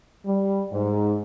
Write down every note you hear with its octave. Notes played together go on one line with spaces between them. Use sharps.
G3
G#2